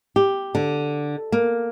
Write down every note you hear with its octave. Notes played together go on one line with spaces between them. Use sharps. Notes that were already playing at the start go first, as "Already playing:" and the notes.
G4
D3
A#3